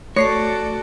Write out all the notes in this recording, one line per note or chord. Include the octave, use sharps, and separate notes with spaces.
A3 F#4 A4 C#5 D5 C7 C#7